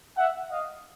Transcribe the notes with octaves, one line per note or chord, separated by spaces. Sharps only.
E5 F#5
D#5 F5